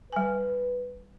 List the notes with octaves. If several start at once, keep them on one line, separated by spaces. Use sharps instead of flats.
G3 B4 G#5